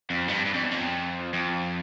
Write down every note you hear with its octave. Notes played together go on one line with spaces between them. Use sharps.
F2
G2
G2
F2
E2
F2
F2